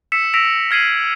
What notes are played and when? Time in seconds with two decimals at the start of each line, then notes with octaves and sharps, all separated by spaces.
0.12 E6 B6 C#7 E7
0.34 E6 A#6 B6 D7 F7
0.71 F6 G#6 C7 D#7 F#7